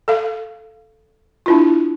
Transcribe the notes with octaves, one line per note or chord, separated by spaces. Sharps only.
A4 F5
D4 E4 F4